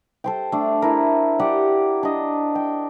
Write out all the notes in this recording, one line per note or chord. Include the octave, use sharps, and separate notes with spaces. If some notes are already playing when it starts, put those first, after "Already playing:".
A4 C5 G5
A3 D4
E4 A#4
G4 D5 F#5
D4 D#5
G5